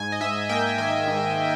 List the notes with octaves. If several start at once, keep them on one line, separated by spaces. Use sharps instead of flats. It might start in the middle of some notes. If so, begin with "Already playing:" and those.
Already playing: G#2 G#5
D#5
G#2 E5
A#3 G5
D#3 G#5
G#2